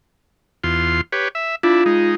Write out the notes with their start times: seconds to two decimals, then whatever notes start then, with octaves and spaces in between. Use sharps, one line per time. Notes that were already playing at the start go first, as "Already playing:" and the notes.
0.64 E2 F4 C6
1.12 G4 B4 C#5
1.35 E5
1.63 D4 E4 F4
1.86 G#3 D#4